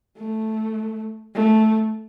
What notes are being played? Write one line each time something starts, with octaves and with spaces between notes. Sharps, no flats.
A3
A3